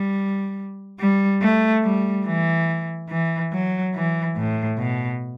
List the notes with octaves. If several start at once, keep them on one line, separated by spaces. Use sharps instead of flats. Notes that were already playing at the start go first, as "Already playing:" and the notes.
Already playing: G3
G3
A3
G3
E3
E3
F#3
E3
A2
B2